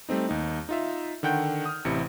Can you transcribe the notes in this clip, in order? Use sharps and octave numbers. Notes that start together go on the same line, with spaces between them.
G3 A3 C4 D#4
D#2 D#4
D#4 F4 E5
D3 D#3 F#5 G5 G6
D#6 F6
A1 C3 E4 C#7